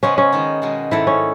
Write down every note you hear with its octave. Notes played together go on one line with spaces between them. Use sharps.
C#3 G#3 B3 C#4
C#4
D#3 G#3 D#4
B2 G#3 D#4 F#4
G#2 D#3 A3 E4
C#4